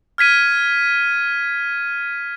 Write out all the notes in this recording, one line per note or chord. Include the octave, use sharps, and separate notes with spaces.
F6 G#6 B6 D#7